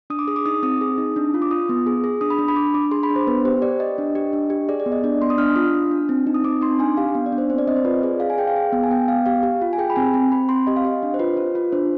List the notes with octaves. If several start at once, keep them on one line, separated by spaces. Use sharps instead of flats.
D4 D#6
D6
G#4 D#6
D6
D#4 D#6
C4 D#6
G#4
D#4
D4
F4
D6
F4 D#6
B3
G#4
G#4
D4 D#6
B5
D4
B5
D4 D6
D4 D6
G#4 C6
B5
D4
C5
B3 B4
G4 C5
G4 D5
G4 D#5
D4
G4
D4
G4
G#4 D5
D5
B3
D#5
D4 D5
B3 C6
D#6
D4 F6
F4 D#6
D4
D4
C4
D#4
D#6
C4 D6
D#4 C6
D4 G#5
G4 F5
B3
D5
D4
C5
C4 C5
D5
C4 D#5
C5
F4 B4
G#4 D5
G#4 F5
G#5
G#4 G5
F5
G#4
B3
G#5
B3 G5
B3 F5
G4 F5
G4
F4
G#5
G#4 G5
B5
C4 G#5
C4
C4 B5
C4 C6
G4 D#5
F5
G4 D#5
D4
C5
F4 B4
F4
F4
D4 C5